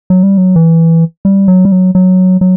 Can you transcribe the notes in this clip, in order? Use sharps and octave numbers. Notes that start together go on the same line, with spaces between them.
F#3
G3
F#3
E3
G3
F#3
G3
F#3
F#3
F#3